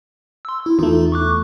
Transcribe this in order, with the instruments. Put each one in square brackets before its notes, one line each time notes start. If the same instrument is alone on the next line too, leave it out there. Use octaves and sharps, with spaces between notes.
[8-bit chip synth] C6 E6
E4
[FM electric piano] E2 A3 [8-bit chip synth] D#4 F4
[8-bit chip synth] C#6 D6 F#6